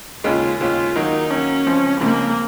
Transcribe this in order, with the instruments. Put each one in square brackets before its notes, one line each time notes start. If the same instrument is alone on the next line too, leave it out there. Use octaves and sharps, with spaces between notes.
[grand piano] D#2 C#3 G#3 C#4 [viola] F4
[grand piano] D#2 C#3 G#3 C#4 [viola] F4
[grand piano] D#3 F#3 A#3 [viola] D#4
[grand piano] D#3 F#3 A#3 [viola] C#4
[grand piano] C#2 C#3 F3 C4
[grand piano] C#2 C#3 F3 C4 [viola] A#3